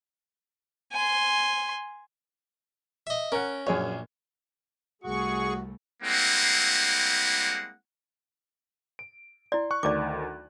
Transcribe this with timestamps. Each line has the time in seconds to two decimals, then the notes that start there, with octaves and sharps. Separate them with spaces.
0.93 G#5 C6
3.07 D#5 E5
3.32 C#4 A#4 F#5
3.67 A#1 F#2 G#4 C#5
5.04 C2 A3 F#4 G#4 C#6
6.03 G3 G#3 A#3 C4 E4 F#5
8.99 D7
9.52 E4 D5 C6
9.71 C#6 F#6
9.83 D2 D#3 D5 D6